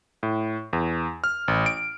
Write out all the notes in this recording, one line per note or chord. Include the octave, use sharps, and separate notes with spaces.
A2
E2
F6
A1
D7